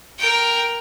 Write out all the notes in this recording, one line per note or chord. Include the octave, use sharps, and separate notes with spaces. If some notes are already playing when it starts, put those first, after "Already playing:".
A#4 G5